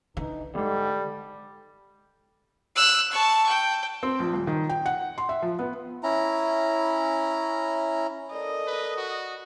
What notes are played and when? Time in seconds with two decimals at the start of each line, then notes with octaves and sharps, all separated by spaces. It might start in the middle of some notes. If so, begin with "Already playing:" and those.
0.17 D3 E3 D#4
0.55 E2 G#2 G3 A4
2.76 E6 F#6
3.11 A5 C#6
3.49 G5
4.03 C4
4.20 A#1
4.33 D#1
4.47 D#3
4.69 G5
4.86 F#5
5.18 C6
5.29 E5
5.42 F3
5.59 B3
6.03 C#4 E4 A#5
8.32 A4 A#4 D5 D#5
8.67 B4
8.97 F#4